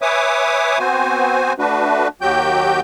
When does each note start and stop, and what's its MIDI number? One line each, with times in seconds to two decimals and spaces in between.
0.02 0.78 71
0.02 0.78 73
0.02 0.78 76
0.02 0.78 80
0.02 0.78 86
0.02 0.78 87
0.79 1.53 59
0.79 1.53 60
0.79 1.53 66
0.79 1.53 72
0.79 1.53 80
1.59 2.08 57
1.59 2.08 62
1.59 2.08 66
1.59 2.08 71
2.21 2.81 39
2.21 2.81 54
2.21 2.81 66
2.21 2.81 67
2.21 2.81 79
2.21 2.81 91